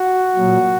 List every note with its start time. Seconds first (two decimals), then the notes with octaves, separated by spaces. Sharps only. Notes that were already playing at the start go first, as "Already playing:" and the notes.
Already playing: F#4
0.35 A#2 F#3